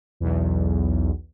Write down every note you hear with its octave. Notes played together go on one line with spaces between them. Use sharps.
B1 E2